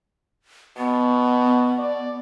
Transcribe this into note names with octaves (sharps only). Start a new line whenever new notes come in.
B2 B3
D5